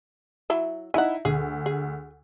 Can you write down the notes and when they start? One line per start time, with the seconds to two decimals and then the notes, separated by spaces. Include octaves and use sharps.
0.50 F#3 E4 E5
0.94 D#4 E4 E5 F#5 G#5
1.25 D2 G#4
1.66 G#4